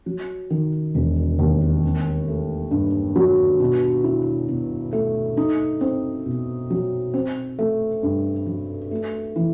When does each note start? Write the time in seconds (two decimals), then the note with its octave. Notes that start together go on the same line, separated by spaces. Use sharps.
0.06 F#3
0.50 D#3
0.95 E1
1.39 D#2
1.83 C4
2.28 A3
2.71 G2
3.16 F#3
3.60 B2
4.04 E4
4.48 B2
4.93 A3
5.37 D#4
5.81 C4
6.26 B2
6.70 F#3
7.14 C4
7.59 A3
8.03 G2
8.46 F#3
8.91 A3
9.36 E3